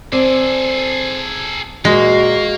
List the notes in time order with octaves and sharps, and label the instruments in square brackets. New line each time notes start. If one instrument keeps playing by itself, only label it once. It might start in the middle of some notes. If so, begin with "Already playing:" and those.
[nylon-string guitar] C4 D5 [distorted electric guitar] G#4 A4
[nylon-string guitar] A#2 [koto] G#3 [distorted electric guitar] A#3 [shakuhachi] F#4